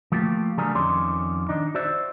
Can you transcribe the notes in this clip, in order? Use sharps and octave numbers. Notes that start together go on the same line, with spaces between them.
F3 A3 A#3 F4 G4
D3 F#3 G3 A3 G#4 A#4
F2 D#3 C#4 D5 C6
D#3 D4 D#4
F#4 C5 D5 E5